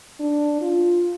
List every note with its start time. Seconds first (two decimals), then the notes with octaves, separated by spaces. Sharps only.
0.20 D4
0.62 F4